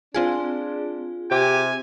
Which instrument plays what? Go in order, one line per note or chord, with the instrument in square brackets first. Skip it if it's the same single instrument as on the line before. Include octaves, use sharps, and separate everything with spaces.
[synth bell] C4 F4 G#4 [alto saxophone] D4
[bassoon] C3 [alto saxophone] G4 [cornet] G#5